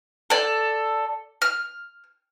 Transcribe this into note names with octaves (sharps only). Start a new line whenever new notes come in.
A4 D5
F6